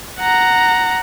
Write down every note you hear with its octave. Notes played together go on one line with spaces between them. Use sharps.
F#5 A#5